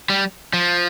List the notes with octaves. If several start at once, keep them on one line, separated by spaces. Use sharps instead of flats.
G3
F3